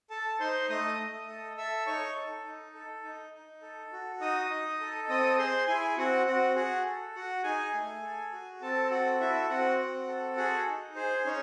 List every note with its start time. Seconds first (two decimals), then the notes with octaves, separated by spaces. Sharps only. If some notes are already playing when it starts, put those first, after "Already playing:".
0.10 A4 A5
0.40 D#4 C5 C6
0.69 A3 D#5 D#6
0.99 A3
1.28 A4
1.57 A4 E5 E6
1.87 D#4 C#5 C#6
2.16 A4
2.45 D#4
2.74 A4
3.04 D#4
3.33 D#4
3.62 A4
3.92 F#4
4.21 D#4 D#5 D#6
4.50 D#4
4.81 A4
5.09 C4 D#5 D#6
5.38 G#4 C5 C6
5.67 E4 G#4 G#5
5.97 C4 F#4 F#5
6.26 C4 F#4 F#5
6.56 F#4 G#4 F#5
6.85 A4
7.15 F#4 F#5
7.43 D#4 G#4 G#5
7.74 A3
8.03 A4
8.32 F#4
8.61 C4 A4 A5
8.91 F#4 A4 F#5
9.20 E4 F#4 E5
9.49 C4 F#4 F#5
9.78 C4
10.08 A4
10.37 F#4 G#4 F#5
10.67 D#4
10.95 G#4 C5
11.25 C#4 D#4 C#5